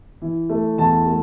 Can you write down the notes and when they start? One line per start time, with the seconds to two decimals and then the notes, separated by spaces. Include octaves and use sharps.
0.22 E3
0.49 A3
0.78 E2 A5
1.07 A3